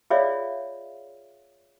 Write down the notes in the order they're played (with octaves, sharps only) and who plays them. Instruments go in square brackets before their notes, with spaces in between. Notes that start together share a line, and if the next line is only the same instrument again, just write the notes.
[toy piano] F4 G#4 C#5 D5 E5 F5